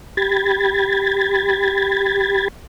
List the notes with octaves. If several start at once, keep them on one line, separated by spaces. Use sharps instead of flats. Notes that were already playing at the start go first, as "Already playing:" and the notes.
G4 B5 G#6 A6